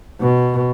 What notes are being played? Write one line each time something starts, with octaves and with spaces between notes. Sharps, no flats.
B2